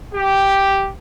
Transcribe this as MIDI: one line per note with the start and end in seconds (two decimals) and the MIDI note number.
0.14 0.88 67